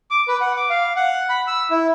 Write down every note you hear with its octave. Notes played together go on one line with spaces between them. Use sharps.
D6
B4
F#5
D6
F5
F#5
B5
E6
E4